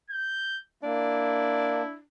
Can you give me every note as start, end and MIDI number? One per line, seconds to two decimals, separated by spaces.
0.10 0.60 91
0.83 1.82 58
0.83 2.01 62
0.83 1.96 64